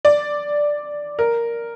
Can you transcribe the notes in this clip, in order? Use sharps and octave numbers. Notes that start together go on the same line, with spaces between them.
D5
A#4